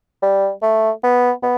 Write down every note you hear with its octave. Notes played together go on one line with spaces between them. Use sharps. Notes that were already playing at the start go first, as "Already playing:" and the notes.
G3
A3
B3
B3